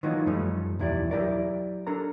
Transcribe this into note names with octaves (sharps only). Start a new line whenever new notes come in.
D#3 E3 F#3 A#3 D#4 F4
F#2 F3 G3 A3 C#4
B1 E2 E4 G4 D5
F#3 E4 G4 A#4 D5
D4 A4 A#4 A#5